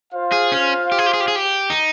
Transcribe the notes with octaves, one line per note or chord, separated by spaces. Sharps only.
F4 C5 F5
G#4
C#4
G4
G#4
G4
G#4
G4
G#4
G4
D#4